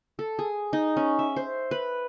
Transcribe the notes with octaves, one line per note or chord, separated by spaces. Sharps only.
A4
G#4
D#4
C#4
E5
C5
B4